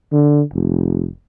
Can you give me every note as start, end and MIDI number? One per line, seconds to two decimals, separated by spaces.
0.13 0.42 50
0.54 1.08 29